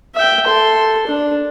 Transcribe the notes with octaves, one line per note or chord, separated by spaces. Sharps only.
E5 G5
A4 C6
D4